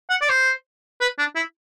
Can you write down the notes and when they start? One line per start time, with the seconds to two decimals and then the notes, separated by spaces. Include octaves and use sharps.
0.10 F#5
0.21 D5
0.29 C5
1.01 B4
1.19 D4
1.36 E4